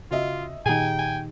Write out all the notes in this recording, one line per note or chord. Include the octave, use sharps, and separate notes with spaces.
C#3 F4 F#4 D#5 E5
A#2 D#3 D#4 G4 G#4 G5 G#5
G#5